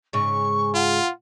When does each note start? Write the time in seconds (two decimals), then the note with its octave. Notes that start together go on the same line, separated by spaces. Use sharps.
0.13 G#2 C#3 C#6
0.75 F4 F#5